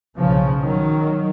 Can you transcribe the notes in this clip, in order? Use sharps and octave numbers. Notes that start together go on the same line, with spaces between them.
B1 A#2 C#3 F3
D#3 F#3